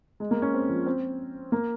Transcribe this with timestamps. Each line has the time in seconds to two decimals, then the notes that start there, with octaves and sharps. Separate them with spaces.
0.20 G#3
0.31 A#3
0.42 C#4
0.54 C4
0.69 F3
0.86 C4
1.52 A#3